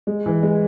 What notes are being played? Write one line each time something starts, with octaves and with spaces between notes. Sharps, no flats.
G#3
E3
G#3